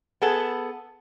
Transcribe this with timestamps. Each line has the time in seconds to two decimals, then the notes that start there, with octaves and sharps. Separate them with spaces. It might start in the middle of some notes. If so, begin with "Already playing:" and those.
0.22 B3 G#4 A4 F#5